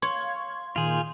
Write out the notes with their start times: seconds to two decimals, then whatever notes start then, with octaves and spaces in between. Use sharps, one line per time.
0.02 C#5 F5 C6 G#6
0.76 A#2 D#3 F4 G#4 G6